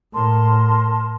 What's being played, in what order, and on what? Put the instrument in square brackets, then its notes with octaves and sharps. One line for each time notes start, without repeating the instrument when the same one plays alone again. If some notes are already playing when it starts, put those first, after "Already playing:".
[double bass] A2 [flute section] A#4 A5 C6